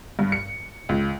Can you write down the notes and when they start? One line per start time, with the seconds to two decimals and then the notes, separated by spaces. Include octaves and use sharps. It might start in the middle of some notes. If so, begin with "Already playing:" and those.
0.19 G2
0.32 C#7
0.89 C#2